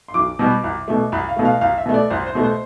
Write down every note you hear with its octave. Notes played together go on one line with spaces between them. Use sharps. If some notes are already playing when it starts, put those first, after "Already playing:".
C6
B1 D6
B2 G3 B3
C2
B2 A3
C2 B5
F5
B2 A3
F5
C2 F5
E5
B2 A3
D5
C2 C5
C5
B2 A3
C5